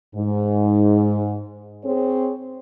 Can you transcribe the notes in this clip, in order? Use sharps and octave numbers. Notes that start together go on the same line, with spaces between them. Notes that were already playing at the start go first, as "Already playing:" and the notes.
G#2
C4 G#4 C#5